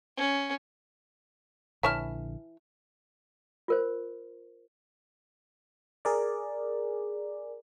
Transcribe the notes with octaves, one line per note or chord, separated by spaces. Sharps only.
C#4
A#1 D3 E3 E4 C#5 E5 A5 F6
F4 A#4 C5
G#4 A#4 D5